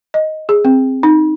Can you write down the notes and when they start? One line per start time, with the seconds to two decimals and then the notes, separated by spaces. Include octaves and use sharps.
0.14 D#5
0.49 G#4
0.65 C4
1.03 D#4